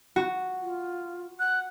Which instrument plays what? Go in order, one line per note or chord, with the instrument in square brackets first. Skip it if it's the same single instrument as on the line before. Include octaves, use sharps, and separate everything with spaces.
[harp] F#4
[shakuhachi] F4
[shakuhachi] F#5 [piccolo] F#6